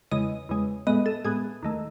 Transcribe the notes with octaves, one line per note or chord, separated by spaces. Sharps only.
E2 C#3 G#3 D#5
E2 C#3 G#3
A2 G#3 B3 D#5
A4
A2 G#3 B3 G#4
D#2 D#3 A3